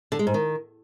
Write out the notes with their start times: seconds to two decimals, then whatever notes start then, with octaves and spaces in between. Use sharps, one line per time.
0.12 D3
0.19 G#3
0.27 G#2
0.34 D#3